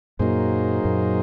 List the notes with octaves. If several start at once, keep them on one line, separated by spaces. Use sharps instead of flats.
F#2 A#2 F#3 A#3 D#4 G#4 C5
F#2 A#2